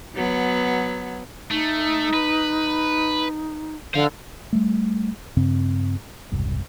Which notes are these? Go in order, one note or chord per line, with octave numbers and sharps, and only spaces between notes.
F#3 B3
A3 D#4
B4
D3 C5 F5
G3 A3
G2 C#3 C4
E1 C2 G2